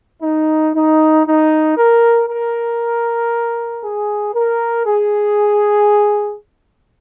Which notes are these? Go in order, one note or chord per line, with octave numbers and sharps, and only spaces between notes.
D#4
D#4
D#4
A#4
A#4
G#4
A#4
G#4